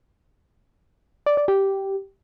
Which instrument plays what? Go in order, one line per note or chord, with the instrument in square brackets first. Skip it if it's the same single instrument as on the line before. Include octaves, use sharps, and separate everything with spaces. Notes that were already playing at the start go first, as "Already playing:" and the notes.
[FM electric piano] D5
D5
G4